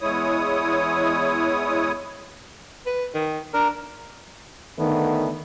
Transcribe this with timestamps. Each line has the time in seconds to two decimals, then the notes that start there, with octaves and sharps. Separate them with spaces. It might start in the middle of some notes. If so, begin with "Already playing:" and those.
0.01 E2 G#3 E4 C#5 D#6
2.86 B4
3.15 D#3
3.54 D4 A#4
4.79 D3 D#3 A3 B3